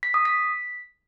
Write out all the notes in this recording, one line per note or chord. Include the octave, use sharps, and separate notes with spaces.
B6
D#6
B6